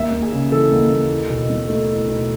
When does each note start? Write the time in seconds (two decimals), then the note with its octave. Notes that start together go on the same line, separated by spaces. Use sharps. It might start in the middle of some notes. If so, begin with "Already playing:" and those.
Already playing: D#2 E5
0.12 D#2
0.22 G#4
0.33 C#3
0.52 E3 A4
0.72 D#2
0.91 D#2
1.10 E4
1.29 B1
1.49 B2
1.68 A3
1.89 E4
2.08 B1